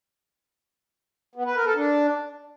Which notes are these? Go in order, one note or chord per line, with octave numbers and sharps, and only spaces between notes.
B3
B4
A#4
A4
D4